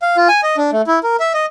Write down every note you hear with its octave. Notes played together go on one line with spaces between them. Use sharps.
F5
F4
G#5
D#5
D4
A3
E4
A#4
E5
D#5